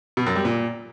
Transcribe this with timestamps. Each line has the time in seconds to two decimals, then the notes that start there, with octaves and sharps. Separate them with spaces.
0.17 B2
0.26 F#2
0.36 G3
0.45 A#2